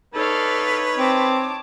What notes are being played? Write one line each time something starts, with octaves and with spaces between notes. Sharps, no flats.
D#4 A4 B4 C#5 D5 F5
C4 A5 D6